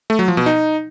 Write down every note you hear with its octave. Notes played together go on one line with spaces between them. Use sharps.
A3
F#3
F3
B2
D#4